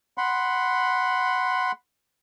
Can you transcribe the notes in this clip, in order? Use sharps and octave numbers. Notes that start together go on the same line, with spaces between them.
F#5 B5 C6